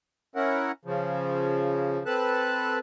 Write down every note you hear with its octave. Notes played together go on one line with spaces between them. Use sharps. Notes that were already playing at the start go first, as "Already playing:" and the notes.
C#4 E4 A#4 F#5
C#3 F3
C4 A4 B4 A5 F#6